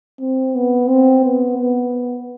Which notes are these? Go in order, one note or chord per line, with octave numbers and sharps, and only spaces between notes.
C4
B3
C4
B3
B3